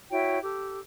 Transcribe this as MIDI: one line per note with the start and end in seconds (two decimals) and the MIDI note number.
0.10 0.38 64
0.10 0.38 66
0.10 0.38 73
0.10 0.38 79
0.42 0.80 67
0.42 0.80 69